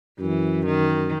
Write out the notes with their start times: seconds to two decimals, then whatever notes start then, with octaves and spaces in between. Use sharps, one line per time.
0.19 F#2 E3
0.66 D#3